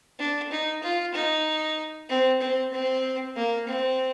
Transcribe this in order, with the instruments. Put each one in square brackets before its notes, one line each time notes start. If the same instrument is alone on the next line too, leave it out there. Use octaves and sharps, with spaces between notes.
[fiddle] D4
D#4
F4
D#4
C4
C4
C4
A#3
C4